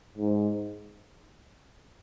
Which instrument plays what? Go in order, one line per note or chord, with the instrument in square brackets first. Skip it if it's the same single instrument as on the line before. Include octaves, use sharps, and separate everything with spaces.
[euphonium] G#2